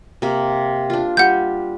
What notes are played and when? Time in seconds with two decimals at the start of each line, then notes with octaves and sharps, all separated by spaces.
0.22 C3 A#3
0.90 D4 F4
1.17 G3 G4 F#5 G6